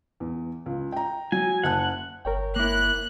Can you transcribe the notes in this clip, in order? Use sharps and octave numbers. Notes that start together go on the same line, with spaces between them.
E2
C#2
G5 A#5
F#3 G#5
F#1 F#5 A5 F#6
G1 A#4 C#5 G5
A#3 E4 F#6